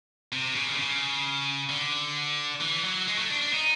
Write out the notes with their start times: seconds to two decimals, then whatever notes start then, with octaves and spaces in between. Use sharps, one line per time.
0.33 C3
0.55 C#3
0.69 D3
0.78 C#3
1.69 D3
2.61 E3
2.85 F#3
3.07 G#3
3.19 A3
3.30 D4
3.42 D4
3.53 D#4